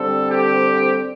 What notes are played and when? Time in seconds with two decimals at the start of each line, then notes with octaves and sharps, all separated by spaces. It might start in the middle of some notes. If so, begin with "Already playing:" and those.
Already playing: D3 G3 C4 A4
0.29 G4